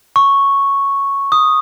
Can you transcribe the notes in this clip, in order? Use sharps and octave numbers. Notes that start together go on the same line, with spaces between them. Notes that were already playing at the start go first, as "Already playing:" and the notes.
C#6
D#6